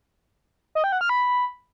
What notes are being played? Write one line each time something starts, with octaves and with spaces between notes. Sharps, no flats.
D#5
G5
F#5
F6
B5